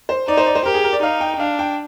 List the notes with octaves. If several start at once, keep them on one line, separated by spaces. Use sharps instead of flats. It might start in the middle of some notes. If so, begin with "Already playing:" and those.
C5
D#4 D5
C5
D5
C5
G4 A#4
G#4
A#4
D5
D#4 F5
G5
G5
D4 F5
G5